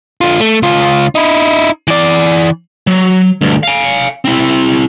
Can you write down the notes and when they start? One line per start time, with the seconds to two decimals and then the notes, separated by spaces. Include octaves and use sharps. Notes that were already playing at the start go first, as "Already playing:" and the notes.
0.21 D3 F4
0.40 A3
0.63 C#2 F4
1.15 D#4 E4
1.88 E3 D5
2.87 F#3
3.41 D2 G2
3.63 F5 G#5
4.25 C4 E4